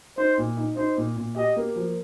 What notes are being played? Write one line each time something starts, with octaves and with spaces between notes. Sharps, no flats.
D#4 C5
A#2
D#4
D#4 C5
A#2
A#2
G4 D#5
A#3
F3